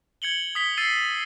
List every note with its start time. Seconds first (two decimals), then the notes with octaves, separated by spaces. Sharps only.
0.22 G#6 C#7 F#7 G7
0.55 D#6 B6 G7
0.77 E6 A6 C7 C#7 D#7